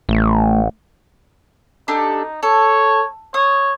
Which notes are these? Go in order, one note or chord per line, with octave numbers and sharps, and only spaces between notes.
A1 A3
D4 D#4 G4 A4
A4 C#5
C#5 D#6